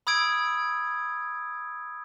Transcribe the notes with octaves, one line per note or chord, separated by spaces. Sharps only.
B5 D#6 E6 G#6 D7